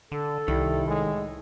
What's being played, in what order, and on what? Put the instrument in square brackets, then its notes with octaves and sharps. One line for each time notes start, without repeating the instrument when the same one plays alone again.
[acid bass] D3 [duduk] A4
[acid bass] C2 [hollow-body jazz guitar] D#3 [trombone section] G3 E4
[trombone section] A2 G#3